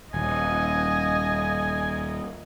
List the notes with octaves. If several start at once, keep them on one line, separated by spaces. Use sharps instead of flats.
D#1 D#5 G#5